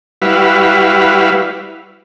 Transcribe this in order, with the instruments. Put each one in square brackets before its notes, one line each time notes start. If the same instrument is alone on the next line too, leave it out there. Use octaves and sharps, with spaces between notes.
[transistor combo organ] G3 E4 F#4 B4 F5